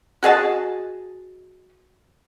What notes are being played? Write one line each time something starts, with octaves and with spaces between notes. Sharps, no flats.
F#4 G#4 D#5 A5